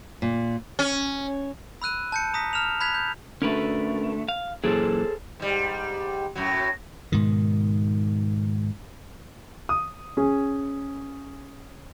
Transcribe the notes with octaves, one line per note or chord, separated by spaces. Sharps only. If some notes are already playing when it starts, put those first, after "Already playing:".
A#2
C#4
B5 E6 F#6 D#7
A5 G6 C#7
A#5 D#6 A#6 B6
A#5 F6 E7 F7
B5 F#6 G#6 B6 F7
G6
D3 A3 C#4 A#4 B4
F5
F#2 A#2 E3 G#4 A4 C5
G#2 G3
F#2 A2 F#3
G#2 B2 D#3
D#6
C#4 G#4